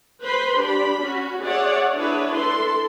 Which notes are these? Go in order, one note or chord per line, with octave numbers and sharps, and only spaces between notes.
B4 C5 B5 C6
D4 G4 B5
C#4 F#4
G#4 C#5 D5 E5 F#5
D4 E4 G#4 B4 C#5
E4 A4 C6